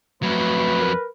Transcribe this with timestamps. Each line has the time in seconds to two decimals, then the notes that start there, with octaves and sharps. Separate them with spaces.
0.23 F2 F#3 A3 B4
0.81 A#4